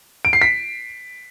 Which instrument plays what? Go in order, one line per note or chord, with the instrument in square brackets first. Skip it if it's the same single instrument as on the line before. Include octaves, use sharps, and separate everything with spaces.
[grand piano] D7
C7
B6